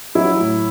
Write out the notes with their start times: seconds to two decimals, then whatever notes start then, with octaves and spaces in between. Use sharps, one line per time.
0.15 F#3 E4
0.39 A2